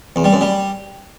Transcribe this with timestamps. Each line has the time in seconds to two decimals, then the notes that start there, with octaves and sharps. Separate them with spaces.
0.16 E2
0.24 G3
0.33 F#2
0.41 G3